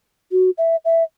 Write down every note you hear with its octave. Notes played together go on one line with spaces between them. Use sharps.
F#4
E5
E5